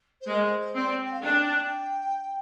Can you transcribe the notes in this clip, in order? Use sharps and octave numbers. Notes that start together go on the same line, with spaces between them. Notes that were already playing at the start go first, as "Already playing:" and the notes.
C5
G#3 A#4
C5
C5
C4 D5
C5
G5
F5
D4 G5